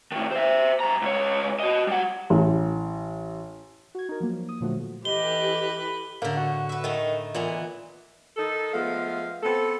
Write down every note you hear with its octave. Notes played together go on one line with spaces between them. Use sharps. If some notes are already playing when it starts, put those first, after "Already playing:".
A2 D#3
C5 E5
G2 A#5
C#2 C#5
F#4 D#5
G3 F#5
A1
F#4 G#6
D#4 A#4
F3 F#3 A#3
D#6
A#2 D3 F3 F#3 A3 F#4
E3 G4 A4 B4 D#5 G7
A2 D3 A#3
F#4
B4 E5
D#3 A3 D#4
A#2 E3 B3
D#3 D#4 A4
F3 G#3 A3 B3 F5
B3 C4 A4